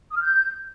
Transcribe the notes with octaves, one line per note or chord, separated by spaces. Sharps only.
D#6
F6
G6